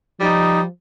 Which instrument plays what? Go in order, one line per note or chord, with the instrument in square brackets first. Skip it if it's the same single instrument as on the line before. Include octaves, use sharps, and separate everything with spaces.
[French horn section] F3 [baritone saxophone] G3 [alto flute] D#4